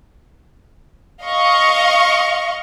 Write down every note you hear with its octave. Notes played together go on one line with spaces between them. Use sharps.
D#5 F5 C#6